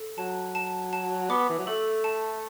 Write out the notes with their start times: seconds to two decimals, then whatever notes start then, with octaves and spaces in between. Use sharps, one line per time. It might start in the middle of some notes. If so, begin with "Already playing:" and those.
Already playing: A4
0.18 F#3 A5
0.55 A5
0.93 A5
1.30 B3 D6
1.49 E3
1.58 F#3
1.67 A3 A4
2.04 A5